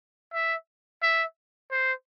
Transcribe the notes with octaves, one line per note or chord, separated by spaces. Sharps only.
E5
E5
C5